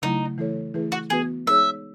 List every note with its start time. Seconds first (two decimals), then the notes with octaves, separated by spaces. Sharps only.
0.02 C#3 F#3 A3 D#4 E4
0.38 E3 A3 E4 A4 C#5
0.74 E3 A3 E4 G#4 B4
0.92 F#4
1.10 E3 B3 F#4 G#4 B4
1.47 G#3 D#4 G#4 C#5 E5